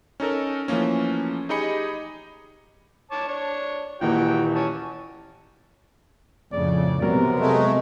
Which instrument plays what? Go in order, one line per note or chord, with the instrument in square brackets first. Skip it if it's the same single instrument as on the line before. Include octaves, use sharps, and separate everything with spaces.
[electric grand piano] C#4 D#4 A4 A#4
E3 F3 A3 A#3 C#4
D#4 G4 G#4 D#5 B5 C#7
[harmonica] C#5 A5 D6
D4 C#5
[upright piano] D#1 D#2 E3 [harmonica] F#4 G5
[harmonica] C#4 A5 C#6
[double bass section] F2 A2 C#3 [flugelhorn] D5
[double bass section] C3 B3 [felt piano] F#3 [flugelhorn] A#4
[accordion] G#3 A3